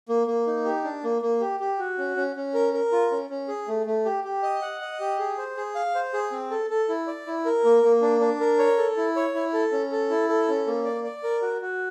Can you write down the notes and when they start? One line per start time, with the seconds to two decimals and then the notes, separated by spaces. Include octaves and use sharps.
0.09 A#3
0.27 A#3
0.47 D#4
0.65 G4
0.84 D4
1.04 A#3
1.22 A#3
1.40 G4
1.60 G4
1.79 F#4
1.98 C#4
2.16 C#4
2.36 C#4
2.54 A#4
2.73 A#4
2.92 F4
3.11 C#4
3.30 C#4
3.48 G#4
3.68 A3
3.86 A3
4.05 G4
4.24 G4
4.43 D#5
4.62 F#5
4.81 D#5
5.00 G4
5.19 G#4
5.38 C5
5.57 G#4
5.75 F5
5.95 C5
6.13 G#4
6.32 C4
6.50 A4
6.70 A4
6.89 E4
7.07 D5
7.27 E4
7.45 A#4
7.64 A#3
7.83 A#3
8.02 D4
8.20 D4
8.40 A#4
8.59 C#5
8.78 A4
8.97 E4
9.16 C#5
9.35 E4
9.53 A4
9.72 C#4
9.92 A4
10.10 E4
10.29 A4
10.48 C#4
10.67 A#3
10.85 D5
11.04 D5
11.23 A#4
11.42 F#4
11.61 F#4